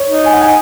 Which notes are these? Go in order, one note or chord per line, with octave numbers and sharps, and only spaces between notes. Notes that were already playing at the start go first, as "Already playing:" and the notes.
Already playing: C#5
D#4
G#5
F#5
G#5